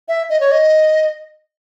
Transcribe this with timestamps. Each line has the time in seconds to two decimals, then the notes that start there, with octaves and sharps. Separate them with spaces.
0.08 E5
0.30 D#5
0.40 C#5
0.52 D#5